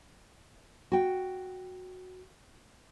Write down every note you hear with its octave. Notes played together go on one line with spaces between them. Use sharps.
F#4 G5